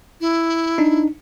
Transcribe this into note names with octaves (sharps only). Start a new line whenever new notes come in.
E4
D4 D#4